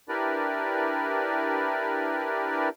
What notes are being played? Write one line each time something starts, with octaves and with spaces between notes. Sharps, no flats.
D4 E4 G4 A#4 B4 D5